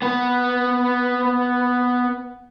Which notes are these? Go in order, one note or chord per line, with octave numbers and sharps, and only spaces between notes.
B3 B4